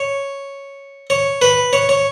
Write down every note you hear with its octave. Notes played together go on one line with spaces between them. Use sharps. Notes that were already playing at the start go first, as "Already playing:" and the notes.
Already playing: C#5
C#5
B4
C#5
C#5